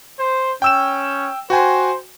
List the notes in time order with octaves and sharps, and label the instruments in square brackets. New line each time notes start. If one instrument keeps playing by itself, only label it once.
[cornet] C5
[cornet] C#4 [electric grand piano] G5 E6 E7
[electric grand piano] F#4 G5 G#5 [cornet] C5